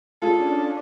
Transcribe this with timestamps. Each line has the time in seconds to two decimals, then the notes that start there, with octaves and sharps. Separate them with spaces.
0.22 C#4 D4 F4 G#4 A4